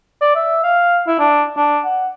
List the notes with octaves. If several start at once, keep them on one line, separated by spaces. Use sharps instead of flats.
D5
E5
F5
E4
D4
D4
F#5